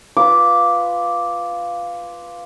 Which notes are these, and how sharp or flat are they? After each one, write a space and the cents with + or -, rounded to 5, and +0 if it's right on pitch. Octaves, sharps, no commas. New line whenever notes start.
F4 +0 B4 +0 D6 -5